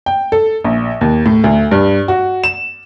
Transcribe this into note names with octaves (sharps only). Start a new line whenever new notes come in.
G5
A4
A#1
D#2
A2
D2
G2
F#4
E7